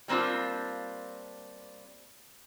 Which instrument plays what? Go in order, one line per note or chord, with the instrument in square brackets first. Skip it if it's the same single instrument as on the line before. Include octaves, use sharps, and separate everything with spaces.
[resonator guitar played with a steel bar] G3 A#3 C4 D4 F4